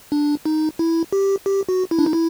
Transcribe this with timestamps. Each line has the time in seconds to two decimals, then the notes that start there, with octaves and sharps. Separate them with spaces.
0.12 D4
0.45 D#4
0.79 E4
1.12 G4
1.46 G4
1.69 F#4
1.91 E4
1.99 D4
2.06 D#4
2.13 E4